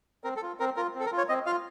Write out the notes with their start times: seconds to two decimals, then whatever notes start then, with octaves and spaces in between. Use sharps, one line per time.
0.24 C4 A#4
0.36 A4
0.43 F4
0.60 C4 A#4
0.76 F4 A#4
0.95 C4
1.00 A4
1.06 A#4
1.12 F4
1.18 C#5
1.29 C4 D#5
1.46 F4 F5